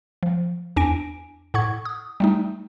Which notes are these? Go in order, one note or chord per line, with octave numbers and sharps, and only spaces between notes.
F3
E2 D4 G#5 A#6 D7
A2 F#5 C#6 G#6
D#6
G3 A3 D#4